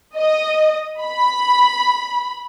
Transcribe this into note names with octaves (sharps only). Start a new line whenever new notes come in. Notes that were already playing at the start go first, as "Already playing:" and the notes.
D#5
B5